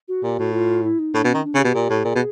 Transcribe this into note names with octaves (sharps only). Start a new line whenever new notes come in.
F#4
A#2 G4
A2 F#4
F4
E4
D#4
A2 D4
B2
C#4
D#3
D4
C#3
G4
B2
A#2
A2
A#2 G#4
B2